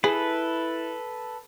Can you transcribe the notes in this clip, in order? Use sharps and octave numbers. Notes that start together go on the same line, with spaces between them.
E4 G#4 A4 B4